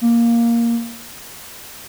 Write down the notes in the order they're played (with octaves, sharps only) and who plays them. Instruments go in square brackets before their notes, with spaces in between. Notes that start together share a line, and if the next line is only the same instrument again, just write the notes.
[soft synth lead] A#3